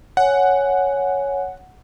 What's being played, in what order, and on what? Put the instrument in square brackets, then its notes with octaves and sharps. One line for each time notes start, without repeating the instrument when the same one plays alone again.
[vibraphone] C#5 G#5 [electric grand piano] F#5